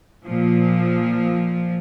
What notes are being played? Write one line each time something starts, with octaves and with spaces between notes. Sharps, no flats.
A#2 F3